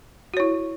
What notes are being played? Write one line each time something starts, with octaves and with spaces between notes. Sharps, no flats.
E4 F#4 C#5